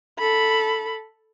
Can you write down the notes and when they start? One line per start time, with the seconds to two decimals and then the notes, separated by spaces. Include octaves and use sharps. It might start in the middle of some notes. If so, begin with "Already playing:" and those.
0.18 A4 B5